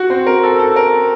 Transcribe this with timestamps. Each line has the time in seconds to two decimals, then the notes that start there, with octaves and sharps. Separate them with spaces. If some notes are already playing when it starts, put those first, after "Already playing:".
Already playing: F#4 F#5
0.10 C4 C5
0.27 A#4
0.43 A4
0.59 A4
0.76 A#4